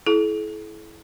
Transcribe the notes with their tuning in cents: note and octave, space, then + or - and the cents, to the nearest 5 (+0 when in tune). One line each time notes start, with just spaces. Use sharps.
E4 +0 A4 -45